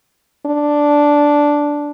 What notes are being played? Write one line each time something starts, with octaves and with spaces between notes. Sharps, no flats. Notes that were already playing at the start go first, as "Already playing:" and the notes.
D4